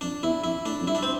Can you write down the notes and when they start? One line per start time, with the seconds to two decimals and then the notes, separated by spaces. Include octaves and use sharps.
0.01 F2 D4
0.23 E2 E4
0.44 F2 E4
0.65 A2 D4
0.81 F2
0.87 G2 E4
0.95 D4
1.03 C4